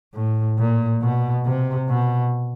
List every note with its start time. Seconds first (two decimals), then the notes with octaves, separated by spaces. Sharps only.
0.14 A2
0.58 A#2
1.02 B2
1.45 C3
1.89 B2